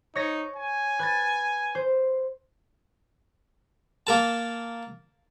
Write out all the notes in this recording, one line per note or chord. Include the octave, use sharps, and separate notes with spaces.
D#4 C#5 A#6
G#5
B4 G#6 A6
C5
A#3 A#4 A5